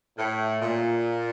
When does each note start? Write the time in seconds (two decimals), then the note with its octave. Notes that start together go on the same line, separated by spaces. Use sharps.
0.18 A2
0.61 A#2